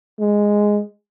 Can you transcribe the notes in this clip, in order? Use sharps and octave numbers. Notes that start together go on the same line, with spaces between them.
G#3